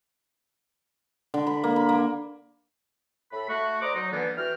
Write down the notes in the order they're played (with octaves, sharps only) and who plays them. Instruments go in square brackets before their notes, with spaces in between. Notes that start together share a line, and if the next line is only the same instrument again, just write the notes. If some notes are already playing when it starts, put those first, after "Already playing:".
[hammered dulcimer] D3
B5
A#3
B5
A#3
[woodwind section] A2 A4 B5
A3 F#4
C5 D5 D#5 A#5 D6
F#3 D#4
D3 E3 G3 A#3 B3
E3 F#4 G5 F6